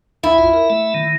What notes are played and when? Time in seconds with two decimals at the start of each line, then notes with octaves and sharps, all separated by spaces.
0.23 D#2 E4 G#5
0.38 A#1 F2 F4
0.54 A#4
0.70 A3 E5
0.95 D#3